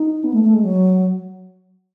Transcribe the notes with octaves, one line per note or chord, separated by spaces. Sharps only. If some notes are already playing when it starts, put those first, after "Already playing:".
Already playing: D#4
B3
A3
A3
G#3
F#3